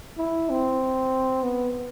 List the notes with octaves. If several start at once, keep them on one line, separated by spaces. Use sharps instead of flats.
E4
C4
B3